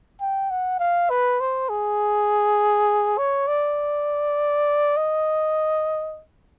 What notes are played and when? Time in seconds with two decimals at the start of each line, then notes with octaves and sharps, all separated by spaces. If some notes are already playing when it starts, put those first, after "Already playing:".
0.21 G5
0.51 F#5
0.80 F5
1.10 B4
1.40 C5
1.69 G#4
3.18 C#5
3.48 D5
4.97 D#5